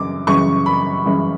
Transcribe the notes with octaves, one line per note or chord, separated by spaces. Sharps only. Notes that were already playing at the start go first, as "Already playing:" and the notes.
Already playing: F#2 C#3 E3 D6
F#2 C#3 E3 C#6
B5
F#2 C#3 E3